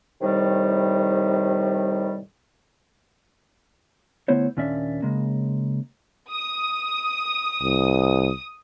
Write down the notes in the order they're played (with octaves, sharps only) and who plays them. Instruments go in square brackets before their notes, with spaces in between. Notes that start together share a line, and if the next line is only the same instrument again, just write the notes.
[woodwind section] A2 C3 D#3 G3
[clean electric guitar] D3 A3 B3 E4 C5 C#5
D#2 A#2 C#4 D4 D5 E5
C#3 G#3 A#3
[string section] D#6
[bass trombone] C2